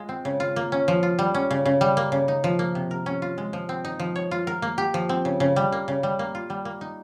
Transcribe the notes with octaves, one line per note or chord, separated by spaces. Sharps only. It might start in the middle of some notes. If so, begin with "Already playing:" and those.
Already playing: G#3 F4
C4
C#3
F4
A#3
C#4
F3
F4
G3
C#4
C#3
C#3
G3
A#3
C#3
D#4
F3
A#3
C3
A#4
C#4
F4
G#3
F3
C4
D#4
F3
C#5
F4
A#4
A#3
G4
F3
C4
C#3
C#3
G3
A#3
C#3
G3
A#3
F4
G3
A#3
D#4